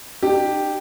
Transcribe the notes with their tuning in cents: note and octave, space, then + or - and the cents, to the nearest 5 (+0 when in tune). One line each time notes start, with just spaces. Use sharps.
D#4 -45 G4 +0